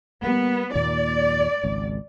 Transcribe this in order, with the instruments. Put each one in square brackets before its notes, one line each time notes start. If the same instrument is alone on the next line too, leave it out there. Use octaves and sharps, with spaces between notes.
[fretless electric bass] G3 A#3 [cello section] B3
[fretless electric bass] D#2 A#2 [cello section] D5
[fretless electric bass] G#1 C#2